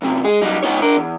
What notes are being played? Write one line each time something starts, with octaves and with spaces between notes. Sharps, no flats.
F#2 C3 F3 F#3
G#3 G#4
F#3 G3 D#4
G#2 B3 D#4 C#5
D4 A#4
E2